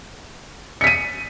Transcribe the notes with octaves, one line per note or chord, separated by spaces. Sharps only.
B6 C#7 D#7